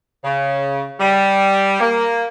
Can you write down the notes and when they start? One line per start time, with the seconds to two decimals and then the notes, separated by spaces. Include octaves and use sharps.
0.24 C#3
1.00 G3
1.81 A#3